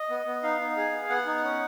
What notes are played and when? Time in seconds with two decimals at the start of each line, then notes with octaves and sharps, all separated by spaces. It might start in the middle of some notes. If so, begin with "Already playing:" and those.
Already playing: D#5
0.10 B3
0.26 B3
0.43 D#4 F5
0.60 D#4
0.77 G#4
0.92 B3
1.09 B3 F#5
1.26 D#4
1.43 C#4